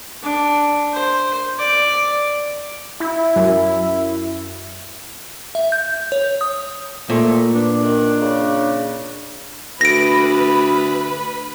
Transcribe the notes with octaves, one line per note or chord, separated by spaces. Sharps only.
D4
C5
D5
E4
F#2
E5
G6
C#5
D#6
A#2 F3 A3
B3 D4
D#3
C#3
D2 B4 B5 A#6 D7